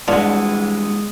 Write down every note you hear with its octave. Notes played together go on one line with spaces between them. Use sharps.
G2 E3 G#3 B3 D4 F4